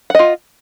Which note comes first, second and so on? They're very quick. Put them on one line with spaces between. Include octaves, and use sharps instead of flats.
F#5 D#5 F4